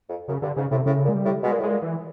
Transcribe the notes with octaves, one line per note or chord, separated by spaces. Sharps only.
F2
F#2 C#3
G2 D3
G#2 C#3
A2 C3
A2 C#3
A#2
G#3
G3
A2
B2 G#3
A#2
A2 G#3
A#2
E3